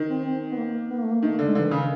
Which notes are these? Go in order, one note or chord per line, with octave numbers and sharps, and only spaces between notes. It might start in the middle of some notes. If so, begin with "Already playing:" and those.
Already playing: D#3
C4
C4
B3
A#3
B3
A#3
A3
A#3
D#3 A3
D3
G#3
D3 E3
D#3
C#3